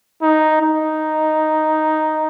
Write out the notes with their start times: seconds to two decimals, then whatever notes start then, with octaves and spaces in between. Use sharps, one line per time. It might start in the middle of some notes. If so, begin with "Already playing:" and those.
0.22 D#4
0.62 D#4